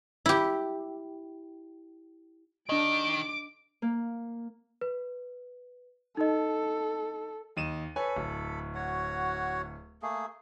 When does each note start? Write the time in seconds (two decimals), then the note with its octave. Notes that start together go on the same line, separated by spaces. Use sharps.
0.26 E4 G4
2.69 D#3 D4 D#5 D6 D7
3.82 A#3
4.81 B4
6.17 D#4 A4 D#5
7.57 D#2 D#5 D#7 E7
7.96 A4 B4 C#5 G#5 B5
8.16 D1
8.75 F#4 C#5 F#5
10.02 A3 A#3 G#4